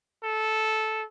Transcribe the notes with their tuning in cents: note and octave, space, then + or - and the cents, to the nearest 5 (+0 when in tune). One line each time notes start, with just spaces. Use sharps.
A4 -10